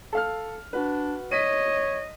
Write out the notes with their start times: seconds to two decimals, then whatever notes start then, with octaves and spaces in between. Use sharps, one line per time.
0.13 A4 F5 F6
0.73 D4 F#4 B4
1.31 C#5 D#5 B6 D#7